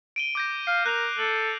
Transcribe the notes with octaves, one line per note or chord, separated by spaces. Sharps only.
D7 D#7 G7
D6 G6 A#6
F5 C7
A#4 F#6 F7
A4 F#7